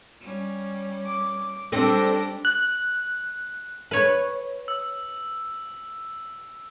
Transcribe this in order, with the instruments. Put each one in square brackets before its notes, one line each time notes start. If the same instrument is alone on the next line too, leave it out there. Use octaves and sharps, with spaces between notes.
[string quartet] G3 C#4
[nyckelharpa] D6
[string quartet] G3 G4 A#6 [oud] C4 A4 [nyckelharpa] D4
[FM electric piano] F#6
[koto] B4 C#5
[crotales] E6